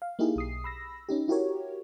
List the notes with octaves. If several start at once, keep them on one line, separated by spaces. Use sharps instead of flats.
F5
A#3 D#4 E4 G4 G#4
B1 D#6 C7
B5 E6 A#6
C#4 D#4 G4
E4 F#4 G4 A#4 C#5